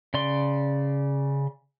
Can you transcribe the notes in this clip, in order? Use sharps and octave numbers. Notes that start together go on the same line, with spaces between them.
C#3 D5 C6